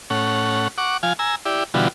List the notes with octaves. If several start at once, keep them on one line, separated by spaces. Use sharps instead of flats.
A2 C#4 F#5
F#5 C#6 D6
F3 F5 G#5
G#5 A#5 E6
E4 G4 D5
B2 D3 E3 G3 F4 F#4